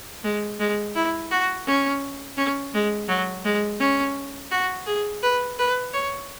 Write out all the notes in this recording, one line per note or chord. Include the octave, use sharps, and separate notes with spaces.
G#3
G#3
E4
F#4
C#4
C#4
G#3
F#3
G#3
C#4
F#4
G#4
B4
B4
C#5